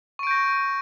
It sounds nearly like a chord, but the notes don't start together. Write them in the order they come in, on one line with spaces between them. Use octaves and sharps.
C#6 D7 G6 A#6